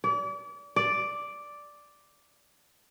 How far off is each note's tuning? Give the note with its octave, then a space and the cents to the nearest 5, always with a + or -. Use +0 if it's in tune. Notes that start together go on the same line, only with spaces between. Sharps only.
D5 -35
D5 +0